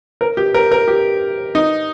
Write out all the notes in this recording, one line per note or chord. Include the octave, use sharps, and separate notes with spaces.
A#4
G4
A#4
A#4
G4
D#4